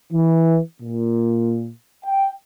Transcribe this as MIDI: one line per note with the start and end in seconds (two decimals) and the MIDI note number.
0.13 0.60 52
0.82 1.71 46
2.05 2.31 79